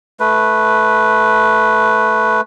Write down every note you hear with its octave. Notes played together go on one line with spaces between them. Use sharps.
A3 B4